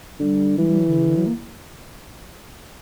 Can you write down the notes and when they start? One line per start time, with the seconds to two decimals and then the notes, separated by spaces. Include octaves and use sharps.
0.20 D3 G3
0.58 E3 G3
0.68 G3
0.78 F#3
0.87 D3
0.97 C#3
1.07 D3
1.17 F#3
1.26 A#3